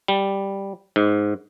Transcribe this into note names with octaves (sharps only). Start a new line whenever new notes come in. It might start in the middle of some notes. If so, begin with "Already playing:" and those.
G3
G#2